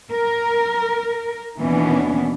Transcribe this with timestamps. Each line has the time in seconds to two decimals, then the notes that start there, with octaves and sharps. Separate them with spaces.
0.12 A#4
1.59 D#2 B2 E3 B3 C#4 D4